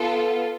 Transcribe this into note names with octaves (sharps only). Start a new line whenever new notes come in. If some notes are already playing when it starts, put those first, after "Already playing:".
Already playing: B3 F4 A4